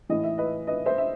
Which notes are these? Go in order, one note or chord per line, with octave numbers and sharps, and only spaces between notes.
A2 E3 D#5
E5
B4 D#5
B4 D#5
C5 E5
E5